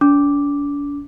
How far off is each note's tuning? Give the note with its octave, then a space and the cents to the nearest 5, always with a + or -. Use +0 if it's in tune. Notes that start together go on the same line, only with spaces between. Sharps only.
D4 -45 D6 +0